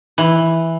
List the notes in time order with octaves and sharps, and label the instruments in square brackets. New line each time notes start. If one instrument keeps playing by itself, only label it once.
[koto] E3